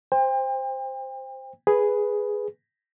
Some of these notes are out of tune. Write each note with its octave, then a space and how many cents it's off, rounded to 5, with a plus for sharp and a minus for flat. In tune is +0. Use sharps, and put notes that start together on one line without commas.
C5 +0 G5 +35
G#4 +0 B4 +0